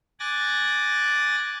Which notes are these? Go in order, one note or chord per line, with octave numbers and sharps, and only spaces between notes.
G#5 D6 F#6 A6 A#6